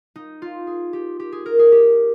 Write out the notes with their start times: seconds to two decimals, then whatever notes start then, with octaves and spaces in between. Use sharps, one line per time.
0.16 D#4
0.42 F4
0.67 G#4
0.93 G4
1.20 G4
1.32 G#4
1.46 A#4
1.59 G#4
1.72 G4